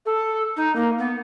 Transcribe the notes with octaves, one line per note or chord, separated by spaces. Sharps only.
A4
D#4
A#3
B3